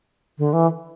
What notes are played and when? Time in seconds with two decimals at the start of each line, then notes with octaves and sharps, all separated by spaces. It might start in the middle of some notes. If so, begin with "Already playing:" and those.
0.38 D3
0.53 E3